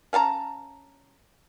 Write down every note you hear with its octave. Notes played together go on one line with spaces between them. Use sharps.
C#4 F5 A5 A#5